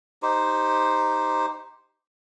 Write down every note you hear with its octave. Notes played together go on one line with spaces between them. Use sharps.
D#4 G4 C5